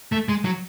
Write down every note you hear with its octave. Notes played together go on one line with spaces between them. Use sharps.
A3
G#3
F#3